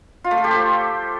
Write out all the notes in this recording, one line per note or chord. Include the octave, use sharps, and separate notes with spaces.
F4
A3
A4
G4
C5